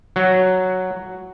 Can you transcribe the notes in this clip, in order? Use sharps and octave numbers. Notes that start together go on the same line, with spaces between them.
F#3